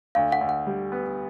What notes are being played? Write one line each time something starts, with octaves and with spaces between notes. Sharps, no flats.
D2 F5
F#5
D2
F#5
G3
B3